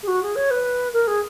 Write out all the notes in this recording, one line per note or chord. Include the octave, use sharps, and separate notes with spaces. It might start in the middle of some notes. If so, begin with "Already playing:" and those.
G#4
F#4
G#4
C#5
B4
A#4
G#4